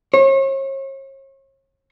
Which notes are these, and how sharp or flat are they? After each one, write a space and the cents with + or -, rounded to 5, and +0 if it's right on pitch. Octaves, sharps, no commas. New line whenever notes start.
C#5 -40